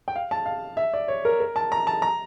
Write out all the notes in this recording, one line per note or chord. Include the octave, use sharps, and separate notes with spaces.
G5
F5
A5
F5
E5
D5
C#5
A#4
A#4
A5
A#5
A5
A#5